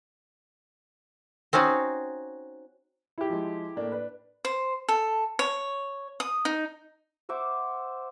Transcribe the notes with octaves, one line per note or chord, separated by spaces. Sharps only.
C4 C#4 D#4 F#4
E4 G4
F3 G#3
A2 A#3 D4
D4 B4
C5
A4
C#5
D#6
D#4
C5 E5 F#5 D6